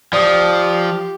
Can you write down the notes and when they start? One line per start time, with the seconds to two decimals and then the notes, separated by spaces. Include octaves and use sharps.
0.13 F3 G4 D5 D#6